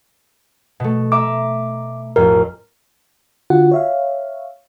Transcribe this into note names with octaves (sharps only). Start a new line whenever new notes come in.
B2 A3
E5 A#5 D6
A1 F2 A#4
D3 F4 F#4 F#5
C#5 E5 F5